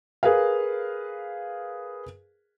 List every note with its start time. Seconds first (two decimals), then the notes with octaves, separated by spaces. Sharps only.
0.23 G#4 A#4 B4 F5